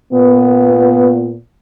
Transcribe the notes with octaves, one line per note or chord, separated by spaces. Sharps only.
A#2 B3